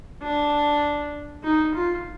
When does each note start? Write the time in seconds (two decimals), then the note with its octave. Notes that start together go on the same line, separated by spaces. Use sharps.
0.23 D4
1.44 D#4
1.75 F4